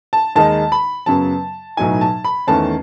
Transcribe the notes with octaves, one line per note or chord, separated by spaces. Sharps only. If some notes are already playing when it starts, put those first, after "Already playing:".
A5
D#2 D#3 G#3 D#4 A5
B5
F#2 C#3 F#3 B3 A5
B1 A2 F#3 B3 D#4 G#5
A5
B5
E2 D#3 A3 C#4 A5